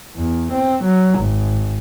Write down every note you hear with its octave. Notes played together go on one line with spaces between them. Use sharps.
E2
C4
F#3
G#1